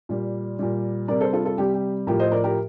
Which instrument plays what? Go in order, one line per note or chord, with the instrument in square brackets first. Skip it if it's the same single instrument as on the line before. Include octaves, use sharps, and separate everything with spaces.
[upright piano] A#2 G3
A#2 G3
C3 G3 A#4 D5
A4 C5
F4 A4
F4 A4
C3 G3 G4
G4
A2 F3 G4 A#4
C5 D#5
A#4 D5
G4 A#4